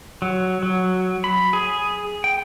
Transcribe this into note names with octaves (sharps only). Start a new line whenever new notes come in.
F#3
F#3
B5
G#4
G5